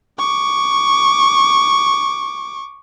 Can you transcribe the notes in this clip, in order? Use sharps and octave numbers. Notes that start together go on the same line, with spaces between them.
C#6 D6